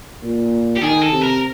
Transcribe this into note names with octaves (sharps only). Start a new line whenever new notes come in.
A#2
G4
D#3 G#4
A4
C3
A#4